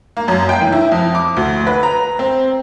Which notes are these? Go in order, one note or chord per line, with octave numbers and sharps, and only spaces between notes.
A#3
F#2
G5
E3
E4
F2
D6
D2
B4
A#5
C4